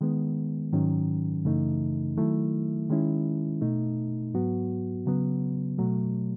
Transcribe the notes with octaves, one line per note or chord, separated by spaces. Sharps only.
D#3 G#3 B3
G#2 D#3 F#3 C#4
F#2 C#3 E3 A3 D#4
D#3 F#3 A3 E4
D#3 G#3 C#4 E4
B2 A3 D#4
G#2 F#3 B3 F#4
C#3 F#3 B3
B2 F#3 A3